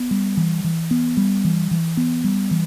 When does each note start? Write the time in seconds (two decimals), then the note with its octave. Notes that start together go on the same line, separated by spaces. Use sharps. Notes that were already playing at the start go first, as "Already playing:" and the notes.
Already playing: B3
0.11 G3
0.37 E3
0.64 E3
0.91 B3
1.17 G3
1.45 E3
1.71 E3
1.97 B3
2.24 G3
2.51 E3